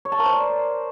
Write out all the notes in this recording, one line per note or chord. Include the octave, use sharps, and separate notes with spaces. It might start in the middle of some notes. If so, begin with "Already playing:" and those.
C#5
A5
A#4
C5
D5